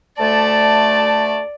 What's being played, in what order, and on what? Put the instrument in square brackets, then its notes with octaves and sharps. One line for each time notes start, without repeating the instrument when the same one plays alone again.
[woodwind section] D2 A3 A5 [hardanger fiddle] D5